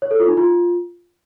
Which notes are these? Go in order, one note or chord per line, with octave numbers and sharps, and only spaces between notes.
C#5
A4
F4
D#4
F4